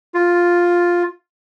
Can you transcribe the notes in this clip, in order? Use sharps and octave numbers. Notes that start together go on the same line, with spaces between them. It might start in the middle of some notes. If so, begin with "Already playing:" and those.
F4